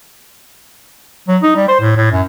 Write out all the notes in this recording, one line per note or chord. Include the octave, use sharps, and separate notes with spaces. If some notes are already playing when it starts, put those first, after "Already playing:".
F#3
D#4
G3
C5
A2
A2
F#2